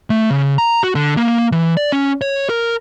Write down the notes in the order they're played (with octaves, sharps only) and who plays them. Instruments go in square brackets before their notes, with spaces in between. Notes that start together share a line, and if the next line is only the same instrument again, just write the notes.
[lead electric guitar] A3
C#3
A#5
F#4
D3
A#3
E3
D5
C#4
C#5
A#4